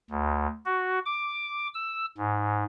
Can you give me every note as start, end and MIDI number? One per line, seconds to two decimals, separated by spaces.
0.10 0.47 38
0.66 0.99 66
1.05 1.67 86
1.74 2.05 88
2.18 2.64 44